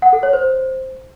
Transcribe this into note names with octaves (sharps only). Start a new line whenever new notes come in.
F#5
A4
C#5
C5